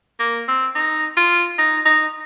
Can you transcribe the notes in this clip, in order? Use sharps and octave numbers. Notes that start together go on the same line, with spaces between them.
A#3
C4
D#4
F4
D#4
D#4